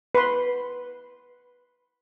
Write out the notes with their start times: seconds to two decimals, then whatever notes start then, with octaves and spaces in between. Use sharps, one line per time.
0.15 B4 C6